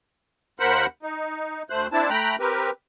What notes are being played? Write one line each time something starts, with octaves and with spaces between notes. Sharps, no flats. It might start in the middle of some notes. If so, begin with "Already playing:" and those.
D#2 A#4 C5 F#5 B5 F#6
D#4
D2 A3 C5 F#6
C4 D4 E4 A5
A3 G5 A#5 B5 F#6
C4 G4 A#4 B4